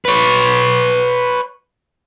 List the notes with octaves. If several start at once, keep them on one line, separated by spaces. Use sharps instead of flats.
B4 C#5